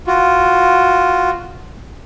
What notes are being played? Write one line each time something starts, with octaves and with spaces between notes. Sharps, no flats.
F4 F#4